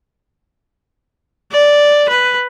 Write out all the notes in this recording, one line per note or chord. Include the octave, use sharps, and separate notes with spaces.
D5
B4